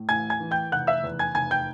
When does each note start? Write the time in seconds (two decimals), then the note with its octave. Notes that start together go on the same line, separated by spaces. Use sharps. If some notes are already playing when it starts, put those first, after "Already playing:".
Already playing: A2
0.09 A1 G#5 G#6
0.30 G#5 G#6
0.40 E3
0.51 G5 G6
0.72 F1 F#5 F#6
0.87 E5 E6
1.04 E2
1.19 G#5 G#6
1.35 F1 G#5 G#6
1.51 G5 G6